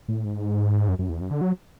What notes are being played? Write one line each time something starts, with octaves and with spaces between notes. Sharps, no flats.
A2
G#2
F#2
F#2
E2
F#2
D3
F#3